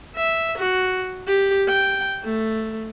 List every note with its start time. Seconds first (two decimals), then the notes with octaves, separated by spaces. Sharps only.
0.16 E5
0.58 F#4
1.27 G4
1.69 G5
2.24 A3